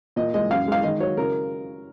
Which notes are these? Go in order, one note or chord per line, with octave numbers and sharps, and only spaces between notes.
A#2 D#5
G#3 D#5
F#2 F5
G#3 F5
D#3 D#5
F#3 C#5
C#3 A#4